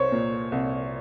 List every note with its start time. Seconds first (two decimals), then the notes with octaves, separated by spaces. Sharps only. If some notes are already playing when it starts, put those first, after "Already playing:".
Already playing: C2 C5 C#5
0.12 A#2
0.52 C2